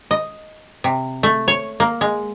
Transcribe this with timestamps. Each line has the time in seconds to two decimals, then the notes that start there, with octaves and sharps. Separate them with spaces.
0.11 D#5
0.84 C3
1.23 A3
1.48 C#5
1.80 A#3
2.01 G#3